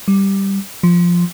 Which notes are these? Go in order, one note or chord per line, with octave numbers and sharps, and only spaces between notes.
G3
F3